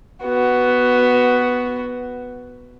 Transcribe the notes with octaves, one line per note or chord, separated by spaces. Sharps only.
B3 F#4